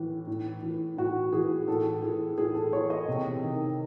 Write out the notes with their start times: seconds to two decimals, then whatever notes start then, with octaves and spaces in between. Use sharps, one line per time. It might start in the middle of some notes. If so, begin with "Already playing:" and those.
Already playing: A2 E3
0.27 A2
0.63 E3
0.97 A2 F#4
1.33 E3 G#4
1.68 A2 A4
2.02 E3 G#4
2.38 A2 G#4
2.55 A4
2.73 E3 C#5
2.90 D#5
3.08 C3
3.42 D#3